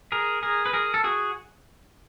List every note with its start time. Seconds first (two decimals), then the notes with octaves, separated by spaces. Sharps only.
0.12 G#4 A#4
0.43 G#4 A#4
0.66 B4
0.73 G#4 A#4
0.94 A4
1.04 F#4 G#4